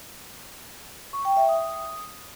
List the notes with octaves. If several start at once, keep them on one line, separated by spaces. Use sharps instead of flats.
C#6
G5
E5
D#6